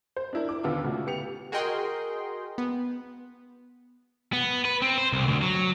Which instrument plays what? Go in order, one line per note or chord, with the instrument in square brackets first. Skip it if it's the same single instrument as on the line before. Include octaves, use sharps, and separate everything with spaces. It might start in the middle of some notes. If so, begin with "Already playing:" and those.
[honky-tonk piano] C5
D4 E4 A#4
D6
D#2 D3 B3 F4 D6 E6
C#3 A3 F#4
B3 G4 C#7 F7
[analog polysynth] F#4 G#4 A#4 D#5 G5 C6
B3
[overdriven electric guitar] B3
B4
C4
C5
C2
D2
F#3